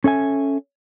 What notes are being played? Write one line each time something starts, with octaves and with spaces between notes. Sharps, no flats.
C#4 A4 E5 G#5